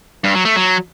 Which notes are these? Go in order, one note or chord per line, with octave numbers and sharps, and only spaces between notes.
G2
F#3
A3
F#3